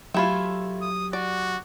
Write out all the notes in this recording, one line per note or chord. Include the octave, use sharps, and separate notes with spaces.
F#3 A3 E4 F4 G4 G#6
D#6
F#4 D5